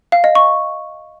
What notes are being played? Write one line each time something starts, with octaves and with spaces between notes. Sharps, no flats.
F5
D#5
C#6